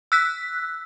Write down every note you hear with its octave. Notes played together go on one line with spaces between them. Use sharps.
E6 F#6 B6